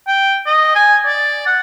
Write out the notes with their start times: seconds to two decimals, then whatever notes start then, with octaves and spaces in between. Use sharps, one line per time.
0.07 G5
0.46 D#5
0.75 G#5
1.07 D5
1.46 F#5